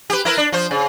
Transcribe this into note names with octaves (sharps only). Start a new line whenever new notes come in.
G4 B4
E4 A#4 B4
D4
F3 C5
C#3